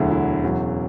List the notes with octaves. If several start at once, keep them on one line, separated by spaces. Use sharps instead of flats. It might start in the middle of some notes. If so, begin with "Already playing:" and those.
Already playing: E1 D2 D3 F#3 E4
E4
E1 E2 C#3 F#3